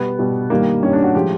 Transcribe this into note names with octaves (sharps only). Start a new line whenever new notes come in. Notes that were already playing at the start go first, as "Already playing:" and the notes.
Already playing: B2 G3 B3
B2 G3
G2 D#3 G3 A#3
G2 D#3 G3 C#4
D4
F#4
A2 F3 G#3 G4